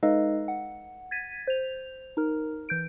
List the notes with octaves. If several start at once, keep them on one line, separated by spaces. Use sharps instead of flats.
G#3 D#4 A4 B4 D#5 F5
F#5
G#6 A6 B6 D#7
C5 F7
D#4 A#4
E3 G6 D7